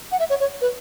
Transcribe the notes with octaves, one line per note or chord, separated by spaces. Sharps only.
F#5
E5
C#5
C#5
B4